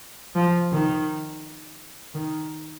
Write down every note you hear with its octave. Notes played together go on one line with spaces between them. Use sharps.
F3
D#3
D#3